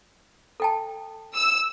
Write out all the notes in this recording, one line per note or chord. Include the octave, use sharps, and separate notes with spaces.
A4 G5 A5
E6